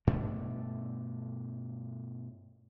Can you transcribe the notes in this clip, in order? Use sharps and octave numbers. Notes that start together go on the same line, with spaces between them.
G2 B2 A3 D4